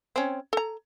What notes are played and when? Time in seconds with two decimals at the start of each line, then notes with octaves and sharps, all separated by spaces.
0.16 C4 C#4
0.53 A4 A#5